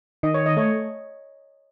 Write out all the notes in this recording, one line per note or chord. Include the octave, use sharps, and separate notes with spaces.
D#3 D#5
C#5
D#5
A3 C#5